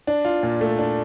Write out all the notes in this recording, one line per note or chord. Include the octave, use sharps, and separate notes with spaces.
D4
F4
A#2
A3
D4